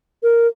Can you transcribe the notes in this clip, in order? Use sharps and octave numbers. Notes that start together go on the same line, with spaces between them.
A#4